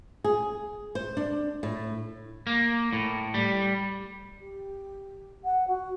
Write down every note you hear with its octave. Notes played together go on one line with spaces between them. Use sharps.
G#4
C5
D4
A2
A#3
A2
G3
G4
F#5
F#4